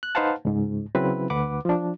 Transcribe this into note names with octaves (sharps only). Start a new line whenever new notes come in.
F#6
D#4 B4 C5 F5 F#5 A5
C#2 G#2
C#3 F#3 C4 E4 B4
D2 B4 F#5 D6
F3 D4